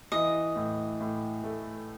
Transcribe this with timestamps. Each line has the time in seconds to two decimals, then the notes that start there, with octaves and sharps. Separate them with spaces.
0.12 E3 D#5
0.56 A2
1.00 A2
1.44 A3